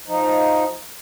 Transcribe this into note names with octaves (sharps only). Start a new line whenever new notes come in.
F3 D#4